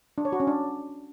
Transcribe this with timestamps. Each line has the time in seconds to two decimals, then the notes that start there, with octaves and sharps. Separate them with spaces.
0.18 D4
0.25 C#5
0.32 F#4
0.40 C#4
0.47 D4